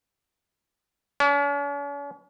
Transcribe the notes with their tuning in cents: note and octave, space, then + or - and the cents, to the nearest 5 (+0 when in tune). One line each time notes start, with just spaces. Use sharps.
C#4 +45